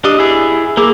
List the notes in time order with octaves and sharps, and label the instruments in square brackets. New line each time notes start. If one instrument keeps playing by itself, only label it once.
[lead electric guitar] D4 D#5 [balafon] G4
[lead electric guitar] E4 G#4
[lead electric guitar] A#3 [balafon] G#4 D6